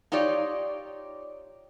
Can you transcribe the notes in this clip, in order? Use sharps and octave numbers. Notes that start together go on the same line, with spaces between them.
D#4 F4 G4 C#5 D5